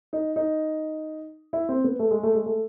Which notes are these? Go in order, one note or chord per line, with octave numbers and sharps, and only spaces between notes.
D#4
D#4
E4
C4
B3
A3
G#3
A3
G#3
A3